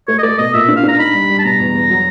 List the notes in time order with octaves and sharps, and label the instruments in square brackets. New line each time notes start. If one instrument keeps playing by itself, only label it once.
[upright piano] A3 [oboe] C#5
[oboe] D#5
[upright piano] A3 [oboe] D5
[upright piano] B2 [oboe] D#5
[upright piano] A#2 [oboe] E5
[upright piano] D4
[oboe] F5
[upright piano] D4 [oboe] A#5
[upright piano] D#4 [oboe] B5
[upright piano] G3
G3
[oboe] A5
[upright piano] B2 [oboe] A#5
[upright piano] E2
E2
F#3